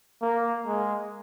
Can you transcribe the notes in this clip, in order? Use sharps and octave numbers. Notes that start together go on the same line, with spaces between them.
A#3
G#3